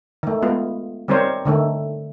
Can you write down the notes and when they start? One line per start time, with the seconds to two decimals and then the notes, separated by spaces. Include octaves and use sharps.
0.23 D#3 A3
0.42 G#3 B3 F4
1.08 D#3 G3 C4 A#4 C5 C#5
1.45 D3 D#3 A3